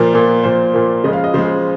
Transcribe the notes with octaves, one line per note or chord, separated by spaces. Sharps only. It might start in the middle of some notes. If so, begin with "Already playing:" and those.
Already playing: A#2 F3 A#3 A#4
A#2 F3 A#3
A#2 F3 A#3 C5
A#2 F3 A#3
C#3 F3 G#3 D#5
F5
D#5
C#3 F3 G#3 C5